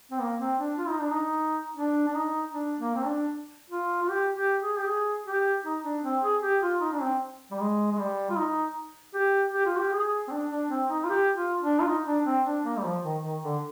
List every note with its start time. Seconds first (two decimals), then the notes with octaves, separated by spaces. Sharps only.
0.11 C4
0.21 A#3
0.40 C4
0.59 D4
0.78 F4
0.89 D#4
1.00 D4
1.11 D#4
1.76 D4
2.07 D4
2.15 D#4
2.53 D4
2.80 A#3
2.95 C4
3.05 D4
3.70 F4
4.02 F4
4.10 G4
4.35 G4
4.61 G#4
4.78 G4
4.87 G#4
5.26 G4
5.64 D#4
5.84 D4
6.04 C4
6.23 G#4
6.43 G4
6.62 F4
6.81 D#4
6.92 D4
7.01 C4
7.51 G3
7.60 G#3
7.92 G#3
7.98 G3
8.30 F4
8.37 D#4
9.14 G4
9.54 G4
9.66 F4
9.78 G4
9.92 G#4
10.28 C4
10.31 D4
10.50 D4
10.70 C4
10.90 D#4
11.04 F4
11.09 G4
11.35 F4
11.62 D4
11.80 F4
11.88 D#4
12.06 D4
12.26 C4
12.45 D4
12.65 A#3
12.77 G3
12.84 F3
13.04 D#3
13.23 D#3
13.43 D3